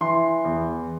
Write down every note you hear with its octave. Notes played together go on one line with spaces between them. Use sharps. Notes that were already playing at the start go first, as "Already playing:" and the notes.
E3 C6
E2